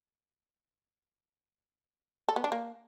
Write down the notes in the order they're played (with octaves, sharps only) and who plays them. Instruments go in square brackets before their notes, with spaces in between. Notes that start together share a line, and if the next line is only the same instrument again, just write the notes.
[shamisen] A4
B3
D4
A#3